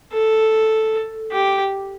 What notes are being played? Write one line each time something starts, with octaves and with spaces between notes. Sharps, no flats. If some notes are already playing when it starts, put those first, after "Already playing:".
A4
G4